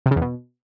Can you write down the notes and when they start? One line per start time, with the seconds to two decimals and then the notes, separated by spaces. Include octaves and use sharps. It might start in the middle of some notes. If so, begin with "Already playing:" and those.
0.06 C3
0.11 C#3
0.16 E2
0.21 B2